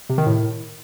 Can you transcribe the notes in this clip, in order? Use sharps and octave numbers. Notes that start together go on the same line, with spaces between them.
C3
D#3
A2